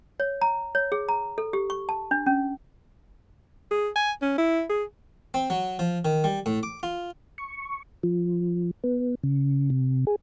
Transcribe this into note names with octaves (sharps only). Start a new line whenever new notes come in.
C#5
A#5
C#5
G#4
A#5
A4
G4
C#6
A5
D4
C#4
G#4
G#5
C#4
E4
G#4
C4
F#3
F3
D#3
G3
A2
D6
F4
C#6
F3
B3
C#3
C3
G#4